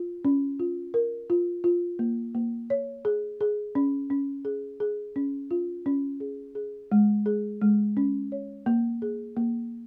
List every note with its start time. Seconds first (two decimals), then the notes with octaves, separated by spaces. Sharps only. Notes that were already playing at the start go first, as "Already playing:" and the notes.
Already playing: F4
0.25 C#4
0.60 F4
0.94 A#4
1.30 F4
1.64 F4
1.99 A#3
2.35 A#3
2.70 C#5
3.05 G#4
3.41 G#4
3.75 C#4
4.10 C#4
4.45 G#4
4.80 G#4
5.16 C#4
5.51 F4
5.86 C#4
6.20 G#4
6.55 G#4
6.92 G#3
7.26 G#4
7.61 G#3
7.97 C#4
8.32 C#5
8.66 A#3
9.02 G#4
9.37 A#3